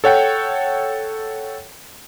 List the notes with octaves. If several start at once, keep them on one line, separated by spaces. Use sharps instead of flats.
A4 C#5 F#5 G5